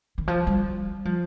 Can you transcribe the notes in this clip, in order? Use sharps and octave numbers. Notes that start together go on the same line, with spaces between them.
D#3
F3
G3
F3